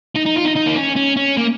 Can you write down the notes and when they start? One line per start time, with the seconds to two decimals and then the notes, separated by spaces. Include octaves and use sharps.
0.16 D#4
0.26 D#4
0.37 F4
0.46 D#4
0.56 D#4
0.67 A#3
0.76 C#4
0.96 C#4
1.17 C#4
1.37 A#3